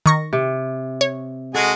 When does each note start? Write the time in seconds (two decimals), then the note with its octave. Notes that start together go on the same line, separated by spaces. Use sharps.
0.06 D#3 C#6 A#6
0.33 C3
1.01 C#5
1.55 G#3 F#4 G#4 A4